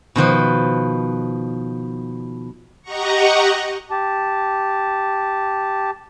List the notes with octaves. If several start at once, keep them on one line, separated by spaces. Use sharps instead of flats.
B2 D#3 F3 B4
G4 D#5 F#5 A#5 C#6
G4 A5